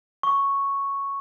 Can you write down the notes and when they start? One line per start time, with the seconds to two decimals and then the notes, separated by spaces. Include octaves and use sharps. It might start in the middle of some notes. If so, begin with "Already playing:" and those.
0.23 C#6